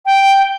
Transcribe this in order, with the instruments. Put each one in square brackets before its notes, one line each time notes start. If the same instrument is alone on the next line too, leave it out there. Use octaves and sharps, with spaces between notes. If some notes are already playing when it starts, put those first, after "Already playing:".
[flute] G5